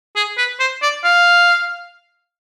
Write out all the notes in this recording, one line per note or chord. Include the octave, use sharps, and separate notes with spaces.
G#4
B4
C5
D5
F5